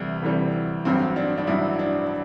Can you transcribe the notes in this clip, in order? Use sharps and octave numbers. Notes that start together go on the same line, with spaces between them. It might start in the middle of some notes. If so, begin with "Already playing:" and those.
Already playing: D2 C3 E3 G3 E4
D2 C3 E3 G3
A1 G2 F#3 C4
D4
D4
A1 G2 F#3 E4
D4